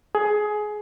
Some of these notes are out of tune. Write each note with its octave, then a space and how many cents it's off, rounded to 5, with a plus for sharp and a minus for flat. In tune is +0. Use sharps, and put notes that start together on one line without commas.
G#4 +20